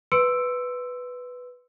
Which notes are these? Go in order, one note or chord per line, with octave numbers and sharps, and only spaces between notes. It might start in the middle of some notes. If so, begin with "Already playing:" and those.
B4 C6 E6 C#7 D7